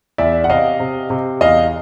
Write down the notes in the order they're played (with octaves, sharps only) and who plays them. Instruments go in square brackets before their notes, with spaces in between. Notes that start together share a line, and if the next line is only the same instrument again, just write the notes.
[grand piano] E2 D5 E5
F#5
C3 D#5 F5
C3
C3
E2 D#5 F5